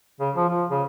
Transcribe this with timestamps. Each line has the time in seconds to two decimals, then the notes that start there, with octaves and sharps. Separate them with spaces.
0.20 C#3
0.35 F3
0.48 F3
0.70 C#3